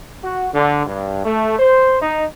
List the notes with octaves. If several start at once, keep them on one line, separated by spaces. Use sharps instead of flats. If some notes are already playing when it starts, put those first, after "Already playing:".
F#4
D3
G2
A3
C5
D#4